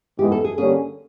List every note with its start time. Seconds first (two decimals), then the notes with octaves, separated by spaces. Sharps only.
0.18 G#2 E3 G#3 B3 G4
0.32 A4
0.45 G#4
0.58 G2 D3 G3 A#3 C#4 G#4